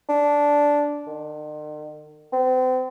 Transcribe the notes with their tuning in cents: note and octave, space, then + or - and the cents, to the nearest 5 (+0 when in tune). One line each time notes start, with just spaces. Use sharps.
D4 -10
D#3 -45
C4 -35